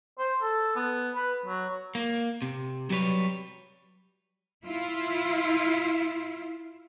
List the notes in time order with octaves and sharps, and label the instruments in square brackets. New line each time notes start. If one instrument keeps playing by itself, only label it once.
[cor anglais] C5
A4
B3
B4
F#3
[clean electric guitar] A#3
C3
F#3 G3 B4 C#5
[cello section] E4 F4